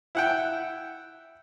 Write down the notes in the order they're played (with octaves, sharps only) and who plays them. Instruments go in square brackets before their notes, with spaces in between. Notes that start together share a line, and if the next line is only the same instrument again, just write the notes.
[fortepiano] E4 F#5 G5